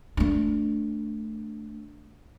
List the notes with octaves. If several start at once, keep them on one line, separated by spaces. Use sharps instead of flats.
A3 D4